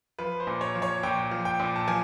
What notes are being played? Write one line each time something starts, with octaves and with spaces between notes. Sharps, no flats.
F3 B4
C5
A#2
C#5
F3
C#5
A#2 G5
F3
G5
A#2
A5
F3 G#5